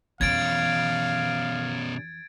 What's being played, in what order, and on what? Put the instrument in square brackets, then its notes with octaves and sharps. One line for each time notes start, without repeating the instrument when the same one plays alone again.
[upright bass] F2 E3 [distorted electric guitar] B2 C#4 [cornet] F5 [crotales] G#6 A6 D7